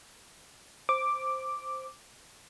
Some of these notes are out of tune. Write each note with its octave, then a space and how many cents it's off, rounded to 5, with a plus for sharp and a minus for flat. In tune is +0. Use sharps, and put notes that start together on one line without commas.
C5 +0 D6 +0